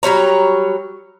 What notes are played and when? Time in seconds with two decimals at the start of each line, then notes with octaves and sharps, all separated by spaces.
0.03 F#3 G3 C#5 A#5